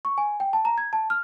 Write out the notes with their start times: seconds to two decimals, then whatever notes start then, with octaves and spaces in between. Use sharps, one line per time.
0.05 C#6
0.18 G#5
0.40 G5
0.53 A5
0.65 A#5
0.78 G#6
0.93 A5
1.10 F6